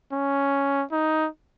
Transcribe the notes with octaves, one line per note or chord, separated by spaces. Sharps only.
C#4
D#4